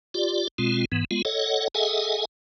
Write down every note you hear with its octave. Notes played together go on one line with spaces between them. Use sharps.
F4 G4 D5
B2 G#3 C4 F4
G#2 E3 B3
G#3 B3 F4
A4 C#5 D#5 F#5
G#4 A4 D#5 E5 F#5 G#5